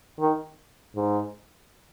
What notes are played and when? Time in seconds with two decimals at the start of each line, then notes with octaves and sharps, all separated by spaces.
0.19 D#3
0.96 G#2